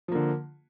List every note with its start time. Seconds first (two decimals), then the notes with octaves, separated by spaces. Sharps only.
0.08 F3
0.12 A#3
0.15 D3